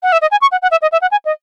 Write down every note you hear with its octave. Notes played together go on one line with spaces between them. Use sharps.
F#5
E5
D#5
G#5
C#6
F#5
F#5
E5
D#5
E5
F#5
G#5
D#5